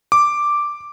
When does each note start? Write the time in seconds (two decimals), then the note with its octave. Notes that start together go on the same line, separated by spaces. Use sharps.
0.12 D6